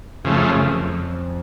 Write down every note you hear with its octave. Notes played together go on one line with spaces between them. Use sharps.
F#2 C#3 F3 A3
F2